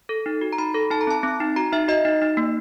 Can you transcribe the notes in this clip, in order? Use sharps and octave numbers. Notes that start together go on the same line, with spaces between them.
A4
D#4
F#4
A#5
D#4 B5
A4
D#4 A5
A#5
C4 A5
C4
D#4
F#4 A#5
D#4 E5
F#4 D#5
D#4
D#4
A#3